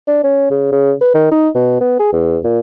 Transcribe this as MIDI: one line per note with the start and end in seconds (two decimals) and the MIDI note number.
0.07 0.21 62
0.23 0.50 61
0.50 0.67 49
0.72 0.93 49
1.01 1.11 71
1.14 1.27 51
1.31 1.49 63
1.55 1.76 47
1.81 1.99 59
1.99 2.09 68
2.13 2.38 40
2.44 2.60 46